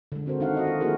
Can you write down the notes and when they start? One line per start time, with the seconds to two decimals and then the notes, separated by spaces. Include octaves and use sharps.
0.12 D3 G#3
0.26 C4 F#4 A#4 C5
0.40 D#3 D4 D#4 F#4 F5 F#5
0.55 F#4 D#5 F#5
0.67 F4
0.81 A3 A#3 E4 F#4 G#4 A#4